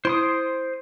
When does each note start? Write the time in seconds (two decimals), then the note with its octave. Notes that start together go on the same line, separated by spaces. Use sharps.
0.05 E4 C5 C6 D#6